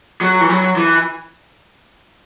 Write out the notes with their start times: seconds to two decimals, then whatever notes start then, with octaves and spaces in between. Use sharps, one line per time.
0.21 F#3
0.41 E3
0.49 F#3
0.76 E3